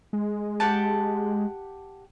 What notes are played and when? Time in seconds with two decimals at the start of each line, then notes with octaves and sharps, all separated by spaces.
0.13 G#3
0.60 G4 F#5 A5